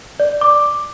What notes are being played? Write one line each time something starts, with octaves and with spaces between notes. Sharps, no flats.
D5
D6